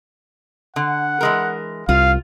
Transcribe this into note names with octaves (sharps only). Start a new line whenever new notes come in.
D3 F#5
E3 G#3 A#4
C2 F4 F5